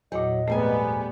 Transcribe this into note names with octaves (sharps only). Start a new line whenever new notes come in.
E2 A#2 F#3 D#5
F2 G#2 G3 A3 B3 G#5